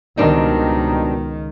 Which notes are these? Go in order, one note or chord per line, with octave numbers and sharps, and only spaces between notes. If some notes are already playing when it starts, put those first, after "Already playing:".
C#2 B2 D#3 G3 C4 D4 D#4 A#4